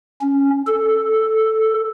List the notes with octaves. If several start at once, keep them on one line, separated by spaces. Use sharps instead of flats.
C#4
A4